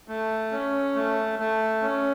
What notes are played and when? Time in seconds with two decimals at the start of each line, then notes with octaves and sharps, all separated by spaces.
0.08 A3
0.52 C#4
0.95 A3
1.39 A3
1.82 C#4